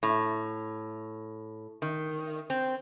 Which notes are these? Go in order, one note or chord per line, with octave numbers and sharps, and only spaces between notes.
A2
D#3
C4